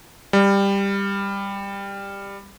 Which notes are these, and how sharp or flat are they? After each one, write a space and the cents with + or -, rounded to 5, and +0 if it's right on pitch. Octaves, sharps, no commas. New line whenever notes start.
G3 +15